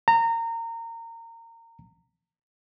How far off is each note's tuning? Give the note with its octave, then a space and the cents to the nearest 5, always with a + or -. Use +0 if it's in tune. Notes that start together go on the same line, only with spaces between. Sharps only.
A#5 -25